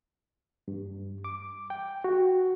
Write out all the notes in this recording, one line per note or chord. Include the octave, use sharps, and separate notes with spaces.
G2
D6
G5
F#4